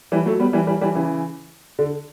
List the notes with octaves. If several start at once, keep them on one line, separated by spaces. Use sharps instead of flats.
E3 G3
F#3 A3
G3 B3
E3 G3
E3 G3
E3 G3
C#3 E3
D3